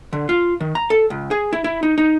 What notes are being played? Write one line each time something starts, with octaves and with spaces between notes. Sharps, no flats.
D3
F4
D#3
A#5
A4
C#2
G#4
E4
E4
D#4
D#4